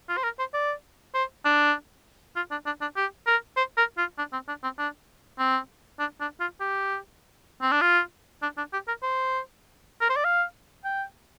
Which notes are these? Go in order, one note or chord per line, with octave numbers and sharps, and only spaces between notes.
F4
C5
A#4
C5
D5
C5
D4
F4
D4
D4
D4
G4
A#4
C5
A#4
F4
D4
C4
D4
C4
D4
C4
D4
D4
F4
G4
C4
D4
F4
D4
D4
G4
A#4
C5
A#4
C5
D5
F5
G5